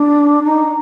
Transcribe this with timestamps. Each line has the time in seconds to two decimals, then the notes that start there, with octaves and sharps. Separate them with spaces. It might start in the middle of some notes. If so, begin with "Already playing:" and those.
Already playing: D4
0.44 D#4